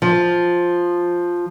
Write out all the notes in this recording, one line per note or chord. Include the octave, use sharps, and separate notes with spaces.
F3